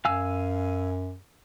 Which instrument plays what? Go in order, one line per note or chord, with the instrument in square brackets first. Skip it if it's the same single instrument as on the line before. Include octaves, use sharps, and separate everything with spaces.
[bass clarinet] F#2 [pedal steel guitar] F5 G#5 E6